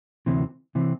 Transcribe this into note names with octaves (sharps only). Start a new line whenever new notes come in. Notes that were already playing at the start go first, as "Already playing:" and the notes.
D2 C3 E3 C4
C3 E3 C4